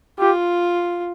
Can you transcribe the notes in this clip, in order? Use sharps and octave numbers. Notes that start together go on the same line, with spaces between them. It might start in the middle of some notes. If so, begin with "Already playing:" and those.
F4 G4